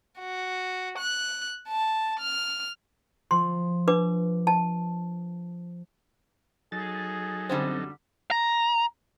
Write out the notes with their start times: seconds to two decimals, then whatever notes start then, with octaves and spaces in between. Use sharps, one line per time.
0.19 F#4
0.98 F#6
1.68 A5
2.20 F6
3.31 F3 C6
3.88 D4 B4 D6
4.47 A5
6.72 F#3 D#4 G#4 A4 A6
7.49 F#2 D3 G3 C4
8.31 A#5